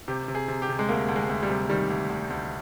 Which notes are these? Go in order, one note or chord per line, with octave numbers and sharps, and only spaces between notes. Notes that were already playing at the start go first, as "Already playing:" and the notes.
C3 G4
C3
G#4
C3
G4
C3
G#3
D2 A#3
D2
G#3
D2
G3
C3
D#3 G3
D2
D2
D2